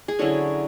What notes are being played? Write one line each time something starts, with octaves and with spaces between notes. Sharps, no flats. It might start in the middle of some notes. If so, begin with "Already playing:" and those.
G#4
D3 F#3 C#4 E4 F#4